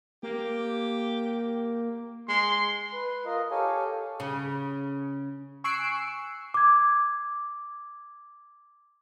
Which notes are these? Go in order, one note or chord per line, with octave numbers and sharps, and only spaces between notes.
A#3 G4
G#3 C6
B4
F4 A#4 D#5
G4 A4 C#5 F5 G#5
C#3
G#5 C#6 E6 F#6 C7 D7
D6 G#6